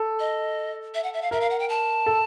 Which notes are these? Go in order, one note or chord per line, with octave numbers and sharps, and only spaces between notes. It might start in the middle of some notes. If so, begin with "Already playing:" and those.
Already playing: A4
D#5
E5
F#5
E5
F5
A#4 E5
F5
F#5
G5
A5
A4